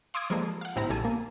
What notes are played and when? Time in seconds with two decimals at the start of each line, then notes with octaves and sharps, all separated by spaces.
0.14 F5 C6 D6 D#6 G#6 D7
0.30 F3 G3 G#3 A#3 A4
0.61 F5 F#5
0.76 G1 A2 C4 E4 A#5
0.90 A#1 G3 A4 G#5 A5
1.05 A#3